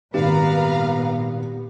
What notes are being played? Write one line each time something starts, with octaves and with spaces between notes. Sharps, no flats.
G#1 A#2 G3 B3 G4 B4 F5 A#5